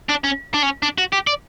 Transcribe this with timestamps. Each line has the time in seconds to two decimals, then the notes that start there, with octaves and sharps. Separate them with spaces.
0.09 D4
0.24 C#4
0.54 D4
0.63 C#4
0.83 D4
0.98 F#4
1.13 G4
1.27 D5